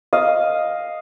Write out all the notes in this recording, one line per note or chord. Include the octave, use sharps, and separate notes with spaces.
D#5 F5